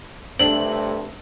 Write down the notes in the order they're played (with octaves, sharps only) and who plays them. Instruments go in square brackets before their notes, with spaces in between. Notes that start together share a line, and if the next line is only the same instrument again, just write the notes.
[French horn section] G2 C3 A3 [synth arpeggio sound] C4 D4 [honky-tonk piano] F#7